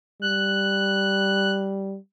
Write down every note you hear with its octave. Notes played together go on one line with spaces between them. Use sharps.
G3 F#6